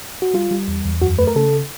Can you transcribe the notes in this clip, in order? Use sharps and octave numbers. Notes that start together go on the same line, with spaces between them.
F#4
G3 F4
G3
E2
E2
F#2 F#4
A3 B4
A#4
C#3 A4